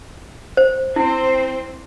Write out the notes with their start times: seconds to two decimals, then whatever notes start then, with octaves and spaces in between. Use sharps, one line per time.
0.57 C5
0.96 C4 E4 C5